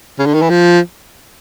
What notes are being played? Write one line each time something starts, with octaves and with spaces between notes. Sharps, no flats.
C#3
D3
D#3
E3
F3